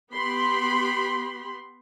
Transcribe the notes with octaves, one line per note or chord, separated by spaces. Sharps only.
B3 G4 B5 C6